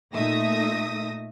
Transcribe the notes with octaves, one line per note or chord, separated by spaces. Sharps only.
A#2 A3 D#4 E5 D#6 A#6